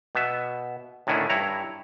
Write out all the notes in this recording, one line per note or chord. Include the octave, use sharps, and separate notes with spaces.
B2 B3 E5
A2 D3 D#3 C#4 D4 E4
G2 E4 C#5 A#5